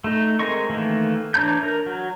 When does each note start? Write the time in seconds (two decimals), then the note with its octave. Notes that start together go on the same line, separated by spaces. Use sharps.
0.04 A3 D#4
0.39 G#3 C4 A#4 D#5 C#6
0.70 D#3 E3 A3 A#3
1.34 E3 D4 C#5 A#5 G6
1.63 A#4
1.86 F#3